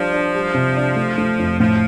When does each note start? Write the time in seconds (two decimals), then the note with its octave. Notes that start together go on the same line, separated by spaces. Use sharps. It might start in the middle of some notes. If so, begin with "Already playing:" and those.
Already playing: F3 G3 D4
0.13 D4
0.35 G3
0.54 C3
0.76 D4
0.96 A3
1.18 A3
1.39 F2
1.60 A2 F3